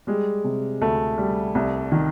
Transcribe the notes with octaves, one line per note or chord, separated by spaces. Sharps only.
G3 G#3
C3
D2 A3
G3
C2
D#3